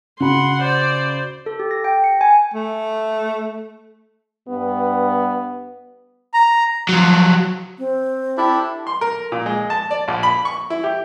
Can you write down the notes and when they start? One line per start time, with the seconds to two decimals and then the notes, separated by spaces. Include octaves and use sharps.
0.20 C#3 F#4 F#5 B5 C6
0.62 C5 D5
1.46 A4
1.59 G4
1.71 A#6
1.84 G5
2.04 C#7
2.21 G#5
2.54 A3
4.48 G2 B3
6.34 A#5
6.89 F3 F#3
7.79 C4
8.38 D4 E4 G4 A4
8.87 C6
9.01 A#4
9.32 A#2
9.46 G#3
9.70 A5
9.91 D5
10.08 A#1
10.23 B5
10.45 C#6
10.70 E4
10.84 G4